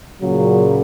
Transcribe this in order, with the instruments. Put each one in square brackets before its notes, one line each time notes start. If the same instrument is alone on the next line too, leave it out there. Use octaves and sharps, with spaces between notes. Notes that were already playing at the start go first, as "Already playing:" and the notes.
[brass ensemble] A#2 C#3 [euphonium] F#3